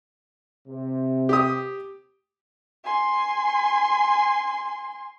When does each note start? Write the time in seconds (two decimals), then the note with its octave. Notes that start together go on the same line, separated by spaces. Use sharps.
0.68 C3
1.29 G4 D#6
2.84 G#5 C6